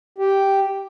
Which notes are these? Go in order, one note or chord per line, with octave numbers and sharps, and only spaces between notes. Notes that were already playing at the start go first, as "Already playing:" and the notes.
G4